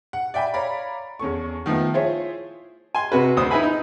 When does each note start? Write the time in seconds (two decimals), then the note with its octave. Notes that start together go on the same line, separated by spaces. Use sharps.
0.13 F#5
0.34 D5 E5 G5 G#5 B5
0.54 C#5 D5 F5 A#5 B5
1.19 E2 C#4 A4 C#6
1.66 D#3 F3 A3 B3
1.93 E4 F4 G#4 C5 C#5 E5
2.95 G#5 C6
3.12 C3 F#4 B4
3.37 D2 C5 D#6
3.50 D#4 E4 B4 G#5 B5
3.63 D#4